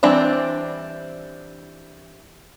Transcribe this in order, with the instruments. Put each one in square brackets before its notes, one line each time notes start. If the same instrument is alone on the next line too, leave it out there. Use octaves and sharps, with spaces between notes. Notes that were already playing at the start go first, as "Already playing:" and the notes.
[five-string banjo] E3 G3 C4 D4